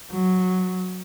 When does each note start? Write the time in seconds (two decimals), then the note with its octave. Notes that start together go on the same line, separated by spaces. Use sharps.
0.12 F#3